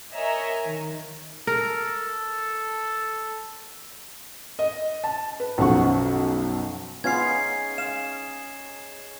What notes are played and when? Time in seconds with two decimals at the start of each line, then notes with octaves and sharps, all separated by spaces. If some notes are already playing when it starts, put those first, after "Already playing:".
0.14 A#4 C#5 D#5 E5 G#5 A#5
0.66 D#3
1.47 A4 A#4
4.59 D#5
5.04 A5
5.40 B4
5.58 B1 F#2 F3 F#5 C#6
7.04 B3 C#4 D#4 F4 G#4 F5 G#6 C7
7.78 F5 E7